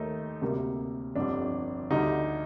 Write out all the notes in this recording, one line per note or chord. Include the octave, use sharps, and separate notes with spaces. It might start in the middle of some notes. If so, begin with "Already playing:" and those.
Already playing: D#2 D#3 A3 D#4
D2 C3 G3 A#3
G1 F2 D3 G3 D4
D2 D3 G3 D#4